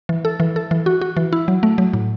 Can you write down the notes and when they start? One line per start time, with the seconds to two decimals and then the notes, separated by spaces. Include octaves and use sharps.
0.09 E3
0.25 A4
0.40 E3
0.56 A4
0.71 E3
0.86 F#4
1.01 F#4
1.17 E3
1.33 E4
1.48 F#3
1.63 A3
1.78 F#3
1.93 A2